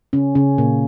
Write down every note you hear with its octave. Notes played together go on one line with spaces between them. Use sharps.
C#3 C#4
C#3 C#4
A#2 A#3